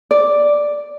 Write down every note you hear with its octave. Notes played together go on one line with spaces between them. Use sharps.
D5